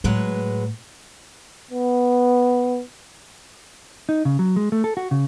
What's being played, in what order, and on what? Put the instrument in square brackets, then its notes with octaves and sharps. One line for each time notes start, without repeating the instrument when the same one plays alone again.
[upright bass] A2 [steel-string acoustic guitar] F#3 G#3 B4
[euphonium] B3
[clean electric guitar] D#4
C#3
F#3
G#3
A3
A4
F#4
C#3